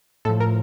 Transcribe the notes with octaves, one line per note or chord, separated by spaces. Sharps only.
A2 F3 A4
A#4